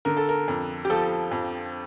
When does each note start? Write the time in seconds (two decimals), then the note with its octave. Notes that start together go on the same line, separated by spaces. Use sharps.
0.05 D3 A#4
0.17 A4
0.29 A#4
0.48 F2
0.85 G4
0.90 F3 A4
1.31 F2